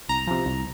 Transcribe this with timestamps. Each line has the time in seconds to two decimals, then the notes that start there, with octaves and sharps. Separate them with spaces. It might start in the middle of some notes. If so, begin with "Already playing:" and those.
0.09 C2 A#5
0.27 C3 F3
0.46 C2